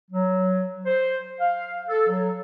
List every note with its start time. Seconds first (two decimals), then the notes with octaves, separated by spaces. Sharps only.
0.11 F#3
0.86 C5
1.41 F5
1.88 A4
2.08 F#3